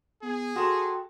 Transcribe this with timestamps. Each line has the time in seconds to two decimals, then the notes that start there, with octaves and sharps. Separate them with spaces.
0.22 B3 G#4
0.56 F#4 A4 G5 C6 D#6